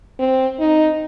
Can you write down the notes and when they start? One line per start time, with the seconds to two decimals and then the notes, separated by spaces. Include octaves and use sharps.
0.19 C4
0.60 D#4